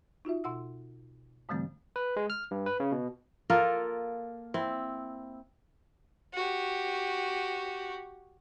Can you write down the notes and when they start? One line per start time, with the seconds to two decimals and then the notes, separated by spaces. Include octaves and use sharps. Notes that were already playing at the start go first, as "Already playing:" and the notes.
0.25 D#4 F4 F#4 E5
0.44 B2 F#5 E6
1.49 G#2 D3 E3 G3 A3 C4
1.96 B4
2.16 G#3
2.30 F6
2.51 G2
2.66 B4
2.80 C#3
2.92 B2
3.50 A#3 F4 A4 A#4
4.54 C4 E4
6.34 F#4 G4